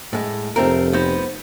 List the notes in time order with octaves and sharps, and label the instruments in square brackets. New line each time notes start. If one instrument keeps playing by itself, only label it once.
[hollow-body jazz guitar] A2 G#3
[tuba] F1 [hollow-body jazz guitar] A3 C4 A#4
[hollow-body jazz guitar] B3 D#4 C5